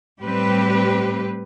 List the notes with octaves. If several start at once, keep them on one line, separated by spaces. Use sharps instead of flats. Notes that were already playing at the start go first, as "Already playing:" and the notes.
A2 G3 C4 G4 B4